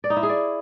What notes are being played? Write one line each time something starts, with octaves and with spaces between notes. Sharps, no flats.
D5
D#4
E4
G#4
D5